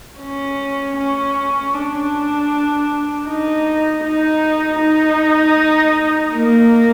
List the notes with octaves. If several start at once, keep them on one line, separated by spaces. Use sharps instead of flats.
C#4
C#4
D4
D#4
D#4
D#4
A#3